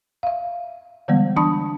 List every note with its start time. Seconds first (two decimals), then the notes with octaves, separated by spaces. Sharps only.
0.23 E5 F5
1.08 D3 E3 G3 G#3 B3
1.36 E3 D4 A5 B5 D#6